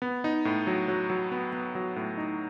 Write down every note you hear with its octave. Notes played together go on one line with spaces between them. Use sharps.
B3
D#4
A2
F#3
F#3
F#3
B3
B3
F#3
A2
D#4